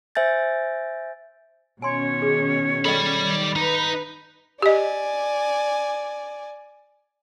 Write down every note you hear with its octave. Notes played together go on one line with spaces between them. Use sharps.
C5 E5 G#5 G6 A6
B2 D#3 C#4 C#5 G#5 C6
G#4
A4 D5 D#5 G5 B5
D#3 G3
D#4 B4
G4 D5 D#5 G#5